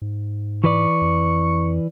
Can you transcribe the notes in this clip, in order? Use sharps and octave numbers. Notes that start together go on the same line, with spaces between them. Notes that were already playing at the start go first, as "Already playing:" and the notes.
G#2
E3 B4 D5 C#6
F2